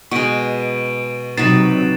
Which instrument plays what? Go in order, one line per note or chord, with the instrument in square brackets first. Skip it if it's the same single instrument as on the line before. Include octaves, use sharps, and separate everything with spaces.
[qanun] B2 G#3 [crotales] C#6 D7 D#7
[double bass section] C3 F#3 [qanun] D#4 F#4 B4 [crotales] A6 C7 E7